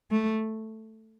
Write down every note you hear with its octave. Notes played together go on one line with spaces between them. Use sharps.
A3